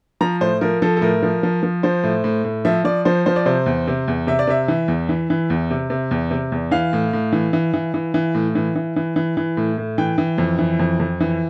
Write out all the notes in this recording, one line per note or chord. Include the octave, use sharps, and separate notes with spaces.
F3 A#5
A2 C5
F3 A#4
F3 A4
A4
A2 A#4
F3
F3
F3
F3 C5
A2
A2
A2
F3 E5
F3 D5
F3 C5
F3 C5
D5
C3 C5
E2
C3
E2
C3 E5
D5
C3 E5
E3
E2
E3
E3
E2
C3
C3
E2
C3
E2
E3 F5
A2
A2
E3
E3
E3
E3
E3
A2
E3
E3
E3
E3
E3
A2
A2
E3 G5
E3
F2
E3
F2
F2
E3